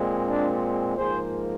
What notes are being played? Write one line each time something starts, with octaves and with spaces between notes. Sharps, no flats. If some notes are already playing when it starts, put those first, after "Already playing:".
Already playing: A#2 G#3 C4
D4
G#2 F3 A#3 G#4 C5